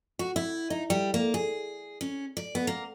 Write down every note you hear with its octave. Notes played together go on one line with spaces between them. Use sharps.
F#4
E4
D#4
G3
A#3
G#4
C#4
D5
B3
A#3